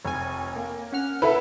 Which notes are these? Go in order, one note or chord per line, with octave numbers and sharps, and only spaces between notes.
F1 C#5 G#5
A#3
C#4 F#5 F6
E4 A4 B4 E5